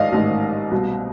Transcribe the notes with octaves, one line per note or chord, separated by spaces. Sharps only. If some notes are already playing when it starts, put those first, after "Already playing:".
Already playing: A1 G#2 D#3 D5 D#5 F5
A1 G#2 D#3
C2 B2